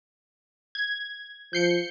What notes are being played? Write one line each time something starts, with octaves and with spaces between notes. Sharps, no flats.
G#6
F3 G6 C7 C#7